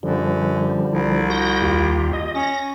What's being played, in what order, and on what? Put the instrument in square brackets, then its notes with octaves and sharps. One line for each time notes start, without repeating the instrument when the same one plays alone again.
[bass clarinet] F#2 [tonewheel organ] D3 F3 G3
[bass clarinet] C2
[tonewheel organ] F#4 G6 A#6
D#2 F4 G4
D#5
[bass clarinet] C#4 [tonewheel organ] A#6